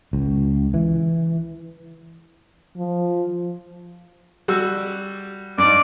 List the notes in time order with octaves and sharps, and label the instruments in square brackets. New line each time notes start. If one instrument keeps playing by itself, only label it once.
[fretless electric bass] C#2
E3
[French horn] F3
[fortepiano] G3 F#4 E6
[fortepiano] G2 D#4 [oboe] D5